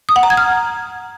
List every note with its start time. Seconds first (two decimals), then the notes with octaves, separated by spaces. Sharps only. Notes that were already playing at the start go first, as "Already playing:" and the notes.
0.09 D#6
0.16 F#5
0.23 A#5
0.30 G#6
0.37 F6